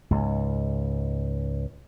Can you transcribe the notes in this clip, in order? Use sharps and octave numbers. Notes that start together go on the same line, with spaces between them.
C#2 G#2